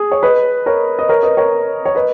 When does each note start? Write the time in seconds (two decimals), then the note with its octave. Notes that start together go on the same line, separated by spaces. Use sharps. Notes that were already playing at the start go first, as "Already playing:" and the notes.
Already playing: G#4
0.12 C#5
0.23 B4 D#5
0.66 A#4 C#5
0.99 D#5
1.09 A#4 C#5
1.23 B4 D#5
1.37 A#4 C#5
1.85 C#5
1.95 B4 D#5